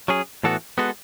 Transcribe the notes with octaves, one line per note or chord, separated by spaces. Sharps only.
F#3 C#4 G#4
A2 E3 B3 F#4 A4
G#3 B3 F#4 A4